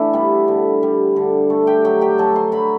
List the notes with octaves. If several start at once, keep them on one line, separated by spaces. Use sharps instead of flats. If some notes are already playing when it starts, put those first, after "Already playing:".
Already playing: E3 A3 D4 E4 A4 D5 E5
G3 B3 B4
D3
G3
D3
A3
G4 G5
F#3 G4 G5
G4 G5
F#3 A4 A5
C5 C6
F#3 B4 B5